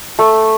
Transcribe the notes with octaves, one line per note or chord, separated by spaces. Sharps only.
A3